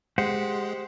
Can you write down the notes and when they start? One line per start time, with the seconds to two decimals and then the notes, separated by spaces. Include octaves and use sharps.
0.18 G#3 G4 C5 F#5